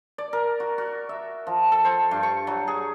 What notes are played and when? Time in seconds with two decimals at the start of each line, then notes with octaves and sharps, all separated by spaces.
0.18 D5
0.33 A#4
0.60 F#4
0.78 F#4
1.09 E5
1.47 F3
1.72 A4
1.85 C5
2.11 G2
2.23 C#6
2.47 F#3
2.68 G#4